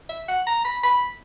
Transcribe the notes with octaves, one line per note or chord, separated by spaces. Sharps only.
E5
F#5
A#5
B5
B5